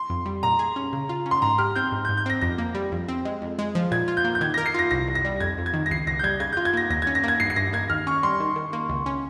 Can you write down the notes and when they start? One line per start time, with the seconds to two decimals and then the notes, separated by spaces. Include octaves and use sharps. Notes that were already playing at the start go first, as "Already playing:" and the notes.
Already playing: C6
0.10 F2
0.26 G3
0.43 A#2 A#5
0.59 G#4
0.76 C#4
0.93 C#3
1.09 F4
1.26 C#4
1.31 C6
1.42 G#2 A#5
1.58 G4 F6
1.75 C4 G6
1.92 G#2
2.05 G6
2.09 G#2
2.17 G6
2.26 C4 A#6
2.41 F2 A#6
2.58 A#3
2.75 G3
2.92 F2
3.08 C4
3.25 G#3
3.42 F2
3.59 G#3
3.75 F3
3.92 A#2 G#6
4.08 F4
4.17 G6
4.25 A#3
4.35 G6
4.41 D#3 G#6
4.54 A#4 A#6
4.66 C7
4.74 F4 A#6
4.91 C2 A#6
5.08 C2
5.15 A#6
5.25 G3
5.40 F2 G#6
5.58 F2
5.66 G#6
5.74 D#3
5.86 A#6
5.91 C#2 C7
6.07 C#2 A#6
6.19 G6
6.23 G3 G#6
6.40 C#3 G#6
6.53 F4 G6
6.65 G#6
6.74 A#3 A#6
6.90 D#2 A#6
7.02 C#4 G#6
7.15 A#6
7.23 A#3 G#6
7.40 G2 C7
7.50 C7
7.56 G2 A#6
7.73 A#3 G#6
7.90 D#2 F6
8.07 C#4 C#6
8.23 G3 C6
8.40 D#3
8.56 D#3
8.73 A#3
8.90 C#2
9.06 C#4